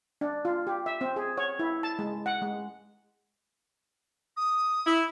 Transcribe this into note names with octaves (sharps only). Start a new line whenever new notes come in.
D4
F4
G4
E5
C4
G#4
C#5
E4
A5
G#3
F#5
G#3
D#6
E4